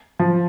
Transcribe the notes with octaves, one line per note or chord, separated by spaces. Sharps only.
F3